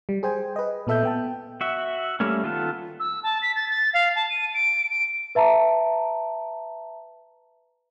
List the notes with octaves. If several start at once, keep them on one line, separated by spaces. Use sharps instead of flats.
G3
G#4 C5 G5 G#5
B4 D#5
A#2 B3 A4 E5 E6 G6
B3 G5 A5
F#4 E5
G3 A3 A#3 C#4
D#3 B3 F4 A4 A5
E6
A5
B6
A6
A6
F5
A5
D#7
D7
D7
B4 E5 A5 A#5